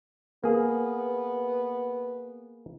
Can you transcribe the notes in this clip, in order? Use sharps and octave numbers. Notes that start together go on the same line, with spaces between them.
A#3 B3 G#4